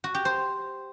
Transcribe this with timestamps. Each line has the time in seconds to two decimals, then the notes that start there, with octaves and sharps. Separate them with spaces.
0.04 F#4
0.15 G4
0.25 C5